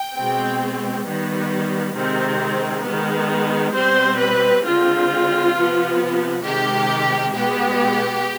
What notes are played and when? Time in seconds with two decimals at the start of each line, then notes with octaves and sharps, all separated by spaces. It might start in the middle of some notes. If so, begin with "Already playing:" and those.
Already playing: G5
0.17 B2 G#3 C4
1.07 D#3 G3 B3
1.97 C3 D#3 G#3 C4
2.86 D#3 G#3 B3
3.76 B2 G3 C4 C5
4.21 B4
4.65 D3 G#3 C4 F4
5.55 C3 F3 B3
6.45 C3 D#3 G#3 G4
7.34 B2 G#3 B3 G4